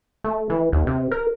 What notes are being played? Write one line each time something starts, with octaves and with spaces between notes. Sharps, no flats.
A3
E3
D#2
C3
A#4